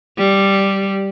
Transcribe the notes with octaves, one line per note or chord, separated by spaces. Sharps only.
G3